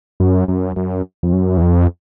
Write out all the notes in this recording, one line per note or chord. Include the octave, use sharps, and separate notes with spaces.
F#2
F#2
F#2
F2
F#2
E2
F2